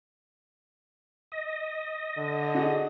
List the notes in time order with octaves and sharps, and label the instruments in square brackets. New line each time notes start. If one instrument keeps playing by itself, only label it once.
[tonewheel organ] D#5
[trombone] D3
[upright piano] D#4 F#4 G#4